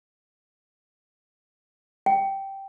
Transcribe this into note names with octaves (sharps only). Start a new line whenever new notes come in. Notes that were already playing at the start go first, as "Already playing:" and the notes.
G5